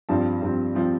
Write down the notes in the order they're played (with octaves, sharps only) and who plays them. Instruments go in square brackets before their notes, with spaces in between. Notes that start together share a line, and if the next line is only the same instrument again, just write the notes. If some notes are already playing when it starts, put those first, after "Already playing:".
[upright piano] G2 F3 C4 A5
G2 F3 C4
F3 C4